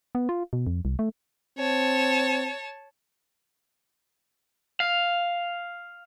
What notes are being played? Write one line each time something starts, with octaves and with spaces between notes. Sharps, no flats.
B3
F4
B2
F2
C2
A3
C4 C#5 A5
F5